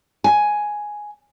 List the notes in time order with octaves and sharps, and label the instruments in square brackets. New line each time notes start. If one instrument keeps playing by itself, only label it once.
[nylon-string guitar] G#5